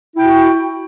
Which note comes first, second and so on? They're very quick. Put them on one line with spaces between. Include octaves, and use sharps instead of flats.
E4 G5 F#4